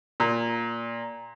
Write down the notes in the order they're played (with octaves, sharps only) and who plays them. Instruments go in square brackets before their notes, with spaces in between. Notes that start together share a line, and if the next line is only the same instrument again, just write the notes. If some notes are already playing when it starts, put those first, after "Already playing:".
[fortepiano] A#2